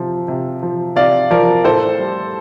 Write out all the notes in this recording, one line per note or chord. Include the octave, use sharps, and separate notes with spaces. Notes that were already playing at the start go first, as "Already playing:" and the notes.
Already playing: C3 F3
C3
F3
C3 D5 F5
F3 A#4 D5
A2 A4 C5
G3